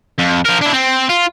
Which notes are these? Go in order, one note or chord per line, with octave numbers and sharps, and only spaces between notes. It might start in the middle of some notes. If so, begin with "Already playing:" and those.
F2
F3 A#4
D4 E4
C4
F4